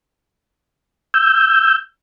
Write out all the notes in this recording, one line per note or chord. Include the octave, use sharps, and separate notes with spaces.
E6 G6